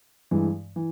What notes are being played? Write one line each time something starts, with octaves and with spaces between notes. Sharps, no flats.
G2 E3 G#3
E3